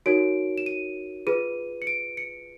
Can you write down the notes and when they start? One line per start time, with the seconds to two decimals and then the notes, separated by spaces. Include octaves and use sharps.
0.06 D#4 F#4 A#4 C#5 D7
0.58 E7
0.66 D#7
1.27 F4 G#4 B4 D#7
1.82 C#7
1.87 D7
2.17 C#7